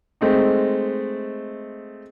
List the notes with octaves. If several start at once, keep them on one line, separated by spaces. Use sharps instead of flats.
G#3 A3 C4 D#4